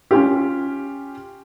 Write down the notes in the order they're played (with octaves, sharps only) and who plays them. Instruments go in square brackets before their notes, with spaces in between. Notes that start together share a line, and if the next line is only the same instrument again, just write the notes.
[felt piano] C#4 F4 G4